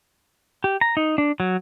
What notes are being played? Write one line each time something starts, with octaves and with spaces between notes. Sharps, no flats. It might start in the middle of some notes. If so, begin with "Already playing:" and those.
G4
A#5
D#4
D4
F#3